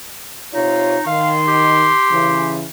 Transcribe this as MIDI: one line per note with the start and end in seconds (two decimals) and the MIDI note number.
0.54 0.98 48
0.54 1.05 63
0.54 0.98 65
0.54 0.98 73
1.07 1.92 51
1.07 1.32 77
1.07 2.60 84
1.47 2.59 67
2.10 2.66 49
2.10 2.66 52